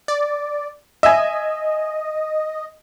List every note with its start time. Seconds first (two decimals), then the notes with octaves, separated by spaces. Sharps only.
0.08 D5
1.03 D#5 E5 G#5